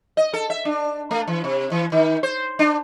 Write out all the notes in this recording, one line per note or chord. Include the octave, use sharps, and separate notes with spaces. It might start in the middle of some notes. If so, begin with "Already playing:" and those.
D#5
A4
E5
D4
A3
E3
C3
E3
D#3
C5
D4